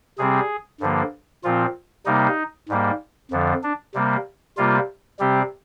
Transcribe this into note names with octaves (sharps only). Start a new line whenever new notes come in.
C3 G3 C4 G#4
G2 D3 F3 A#3
A#2 F3 C4 F4
C3 G3 A#3 D#4
G#2 G3 A#3
F2 D3 F3
D4
C3 G3 A#3
C3 G3 A#3 F4
C3 G3 C4 G4